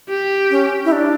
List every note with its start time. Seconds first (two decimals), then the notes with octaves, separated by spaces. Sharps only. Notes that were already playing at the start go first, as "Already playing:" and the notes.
0.09 G4
0.50 C#4
0.85 E4
0.92 D4